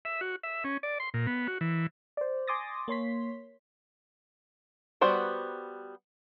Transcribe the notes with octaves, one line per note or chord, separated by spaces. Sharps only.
E5
F#4
E5
C#4
D5
C6
A#2
B3
F#4
E3
C5 D5
G#5 C6 D6 D#6 A6 A#6
A#3 C#5 C6 B6
G3 B3 F#4 C5 G5